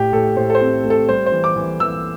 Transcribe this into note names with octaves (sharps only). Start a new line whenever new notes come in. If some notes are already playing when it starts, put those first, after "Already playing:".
Already playing: A2 A3 G4
A2 A4
A2 C5
A4
C5
C4
A3
A4
G3 C5
C5
E3
D6
E3
E3 E6